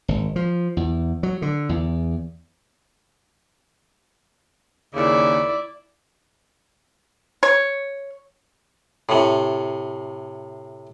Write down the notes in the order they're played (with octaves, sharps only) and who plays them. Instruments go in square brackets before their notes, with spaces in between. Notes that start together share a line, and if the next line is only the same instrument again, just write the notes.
[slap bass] G#1
F3
E2
F#3
D3
E2
[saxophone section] D#2 C#3 [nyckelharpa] E4 D5
[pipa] C#5
[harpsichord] A2 C3